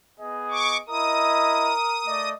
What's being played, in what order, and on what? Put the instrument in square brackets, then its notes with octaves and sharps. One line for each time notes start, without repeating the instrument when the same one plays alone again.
[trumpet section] B3 G#4 D#5
[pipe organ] C#6 D6
[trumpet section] E4 D#5 [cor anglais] A#4 [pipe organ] D#6
[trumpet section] A3 D5 D#5